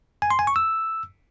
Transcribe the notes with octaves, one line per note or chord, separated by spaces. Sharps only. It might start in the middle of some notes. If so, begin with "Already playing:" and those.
G#5
C6
G#5
C#6
E6